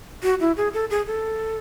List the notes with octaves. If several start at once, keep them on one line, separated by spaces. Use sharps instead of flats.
F#4
E4
G#4
A4
G#4
A4